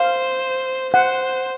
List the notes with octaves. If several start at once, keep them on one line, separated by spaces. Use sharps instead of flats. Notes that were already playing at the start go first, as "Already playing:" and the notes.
Already playing: C5 F5
C5 F#5